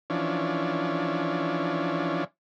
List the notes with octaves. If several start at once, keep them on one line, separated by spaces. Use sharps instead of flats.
E3 F3 C#4 D4